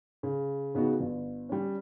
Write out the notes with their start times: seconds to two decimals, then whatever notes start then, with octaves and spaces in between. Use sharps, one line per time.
0.23 C#3
0.75 C#3 B3 D#4 F#4
1.00 G1
1.49 G3 C#4